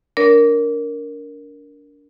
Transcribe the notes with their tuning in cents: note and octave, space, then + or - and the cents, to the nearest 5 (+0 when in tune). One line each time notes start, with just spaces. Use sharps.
D4 -25 A#4 +0 C#5 +45